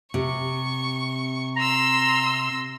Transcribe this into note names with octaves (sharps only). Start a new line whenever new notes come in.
C3 C#6
A#5 C6 E6